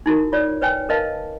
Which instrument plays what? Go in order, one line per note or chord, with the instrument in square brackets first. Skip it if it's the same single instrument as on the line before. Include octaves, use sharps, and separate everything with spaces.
[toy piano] D#4 E4 F#4 A#4
F4 C#5 D5
B4 C#5 G5 G#5
A#4 B4 D#5 F5 A5